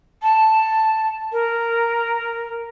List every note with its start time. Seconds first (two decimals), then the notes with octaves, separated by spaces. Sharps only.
0.22 A5
1.32 A#4